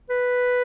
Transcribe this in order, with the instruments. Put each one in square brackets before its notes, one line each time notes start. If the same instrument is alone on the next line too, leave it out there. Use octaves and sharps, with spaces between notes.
[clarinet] B4